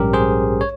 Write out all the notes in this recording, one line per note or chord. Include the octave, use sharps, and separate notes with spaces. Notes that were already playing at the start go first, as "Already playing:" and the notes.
Already playing: A#1 G#2 G3 C#4 G4 A#4
G#4 C5
C#5